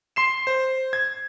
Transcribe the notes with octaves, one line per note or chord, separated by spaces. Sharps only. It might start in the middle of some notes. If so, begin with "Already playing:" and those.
C6 C7 E7
C5
G#6